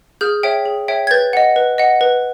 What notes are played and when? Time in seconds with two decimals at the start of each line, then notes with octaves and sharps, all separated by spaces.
0.21 G#4 F6 G6
0.43 C#5 E5 G5
0.65 G#4
0.88 C#5 E5 G5
1.07 G#6
1.11 B4 G6 A6
1.33 D#5 F#5
1.56 B4
1.78 D#5 F#5
2.01 B4